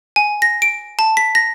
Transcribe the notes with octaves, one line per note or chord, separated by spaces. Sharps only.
G#5
A#6
D7
A5
B6
A#6